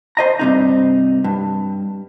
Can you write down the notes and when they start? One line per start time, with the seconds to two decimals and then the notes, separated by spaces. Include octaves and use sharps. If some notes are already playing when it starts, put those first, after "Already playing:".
0.17 C5 D#5 A#5
0.39 G2 C3 D#4
1.24 G2